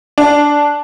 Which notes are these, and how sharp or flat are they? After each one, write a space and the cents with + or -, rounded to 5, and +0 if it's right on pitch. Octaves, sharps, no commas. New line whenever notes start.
D4 -5